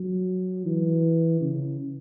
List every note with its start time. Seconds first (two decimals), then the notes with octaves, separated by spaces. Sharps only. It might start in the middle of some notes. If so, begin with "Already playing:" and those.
Already playing: F#3
0.66 E3
1.41 C#3